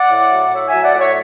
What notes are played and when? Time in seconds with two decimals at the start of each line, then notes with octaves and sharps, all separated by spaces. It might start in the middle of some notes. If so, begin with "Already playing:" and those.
Already playing: D5 F#5
0.11 A2
0.32 F#3
0.53 A2 C#5 E5
0.69 F#3 E5 G#5
0.84 D5 F#5
0.95 A2 C#5 E5